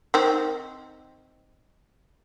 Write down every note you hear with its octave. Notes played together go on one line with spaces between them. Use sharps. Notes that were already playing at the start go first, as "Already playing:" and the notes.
D#3 C4